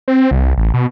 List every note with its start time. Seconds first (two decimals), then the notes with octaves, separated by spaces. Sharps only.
0.08 C4
0.31 C2
0.57 A1
0.74 B2